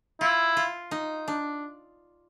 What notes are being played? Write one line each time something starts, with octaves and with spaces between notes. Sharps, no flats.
E4 F4
F4
D#4
D4